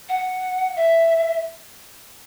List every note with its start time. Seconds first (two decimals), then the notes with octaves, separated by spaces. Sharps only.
0.09 F#5
0.76 E5